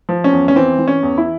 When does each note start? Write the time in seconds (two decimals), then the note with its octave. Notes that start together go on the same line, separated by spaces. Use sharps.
0.09 F3
0.24 C#4
0.32 E2
0.48 C#4
0.56 E3 C4
0.78 E3
0.88 C#4
1.03 E2
1.18 E4